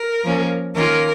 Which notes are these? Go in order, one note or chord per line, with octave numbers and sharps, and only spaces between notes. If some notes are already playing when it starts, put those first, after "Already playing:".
Already playing: A#4
F3 A#3 C#4
D#3 A#3 C#4 F4 A#4